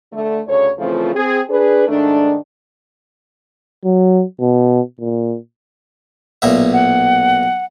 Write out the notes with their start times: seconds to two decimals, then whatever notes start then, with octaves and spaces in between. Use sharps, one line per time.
0.13 D3 A3
0.47 D2 C#3 A4 C#5
0.79 C#3 E3 F3 A3 C4 F4
1.15 C4 G#4
1.50 D4 G#4 B4
1.88 G#2 D#3 A3 D4
3.85 F#3
4.40 B2
5.00 A#2
6.42 B1 A#2 E5
6.73 F#5